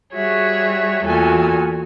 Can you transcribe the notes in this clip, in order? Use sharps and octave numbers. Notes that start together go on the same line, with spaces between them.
G3 F#4 G#4 C#5 E5
E2 A#2 F#4 A4 G#5